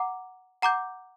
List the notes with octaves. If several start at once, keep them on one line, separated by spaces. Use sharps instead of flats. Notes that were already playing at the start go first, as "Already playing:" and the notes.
Already playing: F#5 A#5 D6
F#5 A#5 D6 G6